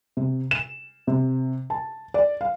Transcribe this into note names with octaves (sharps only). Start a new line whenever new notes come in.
C3
E7
C3
A5
D5
F5